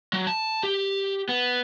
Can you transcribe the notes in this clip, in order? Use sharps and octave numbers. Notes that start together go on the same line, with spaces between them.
F#3
A5
G4
B3